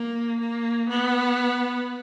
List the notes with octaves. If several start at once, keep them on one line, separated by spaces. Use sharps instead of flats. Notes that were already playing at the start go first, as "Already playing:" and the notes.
Already playing: A#3
A#3
B3